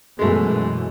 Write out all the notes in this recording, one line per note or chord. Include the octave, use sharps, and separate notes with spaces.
F#2 B2 E3 G#3 A3